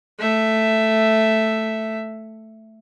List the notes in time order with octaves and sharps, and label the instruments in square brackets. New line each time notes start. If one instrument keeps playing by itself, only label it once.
[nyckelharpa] A3 E5